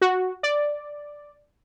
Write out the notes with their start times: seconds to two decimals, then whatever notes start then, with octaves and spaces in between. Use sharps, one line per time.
0.01 F#4
0.43 D5